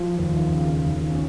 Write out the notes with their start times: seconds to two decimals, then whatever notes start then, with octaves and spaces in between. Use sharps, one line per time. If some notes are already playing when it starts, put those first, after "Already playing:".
Already playing: F3 F4
0.18 D#2
0.52 C#3
0.86 D#2
1.10 C#4